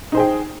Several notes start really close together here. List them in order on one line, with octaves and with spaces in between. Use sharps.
D#4 C5 G#4 G5